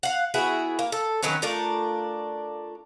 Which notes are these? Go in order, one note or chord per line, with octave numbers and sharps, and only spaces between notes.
F5 F#5
B3 E4 F#4 G#4
A#3
A4
D#3 F#3 B3 C#4
A3 D4 F4 A#4